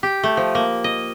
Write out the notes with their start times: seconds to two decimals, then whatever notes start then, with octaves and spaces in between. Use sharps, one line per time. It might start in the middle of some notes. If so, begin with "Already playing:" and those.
0.03 G4
0.24 A3
0.37 F3
0.55 A#3
0.84 D#5